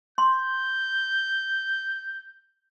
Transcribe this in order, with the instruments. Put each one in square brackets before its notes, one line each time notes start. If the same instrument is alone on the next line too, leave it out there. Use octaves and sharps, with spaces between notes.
[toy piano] C6 [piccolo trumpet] G6